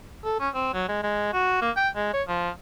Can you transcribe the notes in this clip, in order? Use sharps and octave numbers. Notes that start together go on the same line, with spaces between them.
A4
C#4
C4
F#3
G#3
G#3
F#4
A#3
G5
G#3
C#5
F3